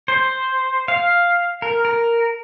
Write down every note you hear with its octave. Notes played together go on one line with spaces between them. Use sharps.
C5
F5
A#4
A#4